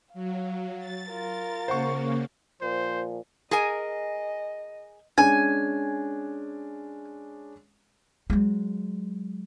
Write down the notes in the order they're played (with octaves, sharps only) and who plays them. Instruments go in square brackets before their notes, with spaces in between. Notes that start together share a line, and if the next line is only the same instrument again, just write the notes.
[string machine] F#3 [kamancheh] F5
[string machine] A6
[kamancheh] F4 A#4
[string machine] C#3 A#3 [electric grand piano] C5 F#5 C#6
[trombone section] A#2 F3 [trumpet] C5
[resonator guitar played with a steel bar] G#4 A#4 G#5 [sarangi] D#5
[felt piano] G#3 C#4 D4 [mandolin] G#5
[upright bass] F#3 G#3